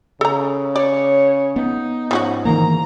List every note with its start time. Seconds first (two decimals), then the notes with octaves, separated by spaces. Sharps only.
0.21 C#3 A4 A#5
0.76 C#5 D5
1.56 B3 D#4
2.11 G#2 F3 C#4 F#4
2.45 D#3 E3 A#3 A#5